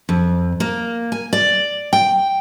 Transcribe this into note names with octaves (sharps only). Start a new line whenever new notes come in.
F2
A#3
G#5
D5
G5